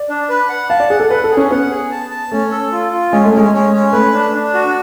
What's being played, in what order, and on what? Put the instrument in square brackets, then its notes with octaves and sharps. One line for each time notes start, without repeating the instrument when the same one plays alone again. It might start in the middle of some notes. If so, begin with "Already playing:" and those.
Already playing: [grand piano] D5
[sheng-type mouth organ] D4
B4
F#5
[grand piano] F5 [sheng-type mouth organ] A5
[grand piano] D5
[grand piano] G#4 [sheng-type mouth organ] F#5
[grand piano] A4
[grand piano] B4 [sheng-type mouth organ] F#5
[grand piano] A4
[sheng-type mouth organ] G#4
[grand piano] C#4
[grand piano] B3 [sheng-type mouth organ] F#5
[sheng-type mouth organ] G#4
A5
A5
[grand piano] A3 [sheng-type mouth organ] C#4
[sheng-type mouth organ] A4
F4
F4
[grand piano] G#3 [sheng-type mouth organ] C#4
[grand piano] A3
[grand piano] G#3 [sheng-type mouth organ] C#4
[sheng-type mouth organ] C#4
C#4
[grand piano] A3 [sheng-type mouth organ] B4
[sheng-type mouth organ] D4
D4
F#4